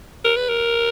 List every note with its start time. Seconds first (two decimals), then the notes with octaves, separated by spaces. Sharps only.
0.25 A#4
0.37 B4
0.49 A#4